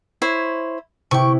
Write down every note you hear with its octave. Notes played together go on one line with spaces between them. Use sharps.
E4 C5 C#5
C3 E4 G5 C#6